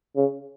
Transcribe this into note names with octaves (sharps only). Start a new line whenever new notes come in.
C#3